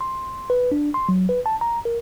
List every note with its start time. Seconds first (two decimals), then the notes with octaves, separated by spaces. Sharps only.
0.01 C6
0.50 B4
0.72 D4
0.94 C6
1.09 F#3
1.29 B4
1.46 A5
1.61 A#5
1.85 A#4